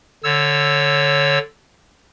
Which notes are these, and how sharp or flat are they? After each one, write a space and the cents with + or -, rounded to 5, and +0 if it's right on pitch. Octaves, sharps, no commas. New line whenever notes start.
D3 +0 C#5 +0 E6 +0